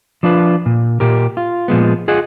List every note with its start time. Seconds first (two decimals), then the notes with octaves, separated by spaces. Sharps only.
0.23 F3 D4 F4 B4
0.66 A#2
1.00 A#2 G4 A#4
1.37 F4
1.68 A#2 F3 G#3 B3
2.08 F4 G#4 D#5 F#5